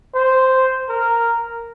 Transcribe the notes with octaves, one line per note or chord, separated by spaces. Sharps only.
C5
A#4